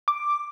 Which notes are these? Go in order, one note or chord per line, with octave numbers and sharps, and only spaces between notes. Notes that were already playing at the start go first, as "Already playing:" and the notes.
D6